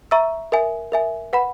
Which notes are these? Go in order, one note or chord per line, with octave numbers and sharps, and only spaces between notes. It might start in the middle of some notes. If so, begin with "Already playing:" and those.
E5 A#5 C#6 E6
A#4 E5 G#5
A#4 E5 G#5
B4 F#5 B5